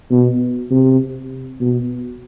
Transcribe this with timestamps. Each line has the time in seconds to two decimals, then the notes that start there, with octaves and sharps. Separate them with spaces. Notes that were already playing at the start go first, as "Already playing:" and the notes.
0.12 B2
0.71 C3
1.60 B2